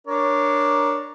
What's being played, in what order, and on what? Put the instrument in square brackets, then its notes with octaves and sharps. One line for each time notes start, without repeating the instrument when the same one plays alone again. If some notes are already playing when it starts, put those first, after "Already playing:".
[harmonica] D4 A#4 C#5